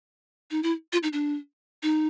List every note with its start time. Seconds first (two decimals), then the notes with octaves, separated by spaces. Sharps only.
0.51 D#4
0.63 E4
0.93 F4
1.03 D#4
1.13 D4
1.83 D#4